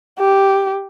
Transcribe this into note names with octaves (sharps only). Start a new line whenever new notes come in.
G4